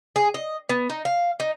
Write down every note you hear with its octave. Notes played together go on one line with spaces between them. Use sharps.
G#4
D#5
B3
D#4
F5
D#4